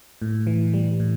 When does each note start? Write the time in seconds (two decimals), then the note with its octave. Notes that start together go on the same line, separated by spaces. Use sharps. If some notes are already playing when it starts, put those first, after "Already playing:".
0.22 A2
0.47 E3
0.74 G3
1.00 A2